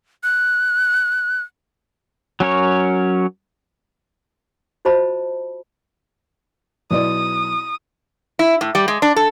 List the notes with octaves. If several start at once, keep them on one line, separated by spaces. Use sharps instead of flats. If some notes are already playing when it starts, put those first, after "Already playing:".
F#6
F#3 C#4 A#4 C#5
F4 F#4 C5 D#5 A5 B5
B1 E4 D5 D#6
E4
A2
G3
G#3
D4
A4